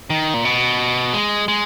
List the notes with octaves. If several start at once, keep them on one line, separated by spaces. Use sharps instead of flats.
D#3
A#2
B2
G#3
G#3